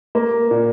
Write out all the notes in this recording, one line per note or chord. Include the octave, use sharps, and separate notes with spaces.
A#3
A#2